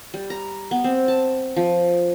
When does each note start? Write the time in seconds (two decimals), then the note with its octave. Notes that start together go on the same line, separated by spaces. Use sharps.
0.14 G3
0.30 A#5
0.71 B3
0.84 C4
1.08 A5
1.56 F3